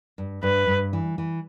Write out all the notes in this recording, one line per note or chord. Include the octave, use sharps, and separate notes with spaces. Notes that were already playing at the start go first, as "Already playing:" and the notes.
G2
G2 B4
G2
E3
E3